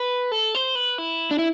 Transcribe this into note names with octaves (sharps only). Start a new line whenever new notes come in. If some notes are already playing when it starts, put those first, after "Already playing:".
Already playing: B4
A4
C5
B4
E4
D4
E4